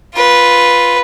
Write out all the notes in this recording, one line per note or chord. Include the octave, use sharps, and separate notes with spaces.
F4 B4